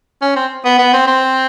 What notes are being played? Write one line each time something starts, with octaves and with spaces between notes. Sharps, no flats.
C#4
C4
B3
B3
C4
C4